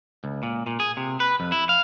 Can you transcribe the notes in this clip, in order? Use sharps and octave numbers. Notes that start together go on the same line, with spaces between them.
C#2
A#2
A#2
G#4
C3
B4
F2
E4
F5